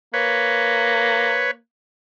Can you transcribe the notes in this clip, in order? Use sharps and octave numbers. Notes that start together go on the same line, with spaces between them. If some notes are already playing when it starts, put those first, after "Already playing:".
A#3 B4 C#5